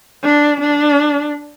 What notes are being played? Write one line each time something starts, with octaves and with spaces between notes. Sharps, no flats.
D4
D4